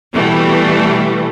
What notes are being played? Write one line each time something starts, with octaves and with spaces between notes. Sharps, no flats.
B2 E3 G3 A3